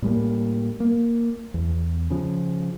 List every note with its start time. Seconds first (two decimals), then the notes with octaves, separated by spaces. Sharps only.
0.02 A2 G3 A#3
0.80 A#3
1.54 E2
2.10 C#3 F3